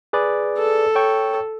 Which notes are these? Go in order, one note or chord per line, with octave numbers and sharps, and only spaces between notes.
G#4 B4 D5
A4
C#5 G5 C#6